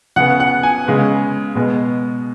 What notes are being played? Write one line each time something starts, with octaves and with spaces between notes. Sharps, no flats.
C#3 B3 F#5
F#5
G#5
C#3 G#3 B3
B2 G#3 B3